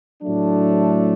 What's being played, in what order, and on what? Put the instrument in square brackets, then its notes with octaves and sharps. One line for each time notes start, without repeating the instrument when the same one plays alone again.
[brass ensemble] A2 F#3 A3 D4